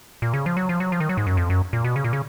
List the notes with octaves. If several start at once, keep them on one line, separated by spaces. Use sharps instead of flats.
A#2
C#3
F3
F#3
F3
F#3
F3
D#3
F#3
G#2
F#2
F2
F#2
A#2
B2
C#3
A#2
C#3